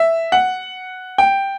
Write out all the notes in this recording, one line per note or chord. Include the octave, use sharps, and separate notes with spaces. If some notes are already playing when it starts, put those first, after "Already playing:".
Already playing: E5
F#5
G5